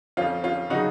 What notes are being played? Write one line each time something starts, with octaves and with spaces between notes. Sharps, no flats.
F2 F3 C#4 F4
C#4 F4
C#3 F#3 D#4 F#4